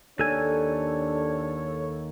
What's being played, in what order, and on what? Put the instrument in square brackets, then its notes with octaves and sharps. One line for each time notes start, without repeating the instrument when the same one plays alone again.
[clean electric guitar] D#2 G#5 [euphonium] D4 [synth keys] A4 [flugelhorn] C#5